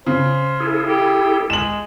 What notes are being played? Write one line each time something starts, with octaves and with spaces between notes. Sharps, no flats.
C#3 C5
E4 G#4 A4
G4
G#3 E7 F#7